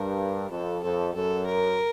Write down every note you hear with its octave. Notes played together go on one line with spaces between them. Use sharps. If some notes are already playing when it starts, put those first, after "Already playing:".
Already playing: G2 A#4
F2 A4
F2 A4
F#2 A4
A#4